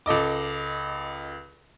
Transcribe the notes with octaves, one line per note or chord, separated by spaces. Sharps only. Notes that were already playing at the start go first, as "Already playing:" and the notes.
C#2 A4 D#5 D6